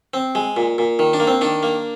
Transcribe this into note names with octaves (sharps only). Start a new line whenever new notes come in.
C4
G#3
A#2
A#2
D#3
D4
A#3
C4
D#3 D4
A#3